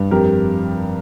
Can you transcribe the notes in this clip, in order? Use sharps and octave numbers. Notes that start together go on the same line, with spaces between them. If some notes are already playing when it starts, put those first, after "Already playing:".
Already playing: G2
F2 G4 A#4